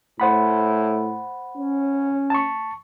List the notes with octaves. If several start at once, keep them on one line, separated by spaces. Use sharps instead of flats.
A2 C5 F#5 B5
C#4
A5 C#6